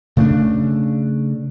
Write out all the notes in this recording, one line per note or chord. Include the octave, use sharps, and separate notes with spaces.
C#3 A3 C#4 D4